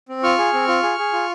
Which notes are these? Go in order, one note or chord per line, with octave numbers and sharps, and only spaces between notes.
C4
F4 C#6 F6
G#4
C4
F4
G#4
G#4
F4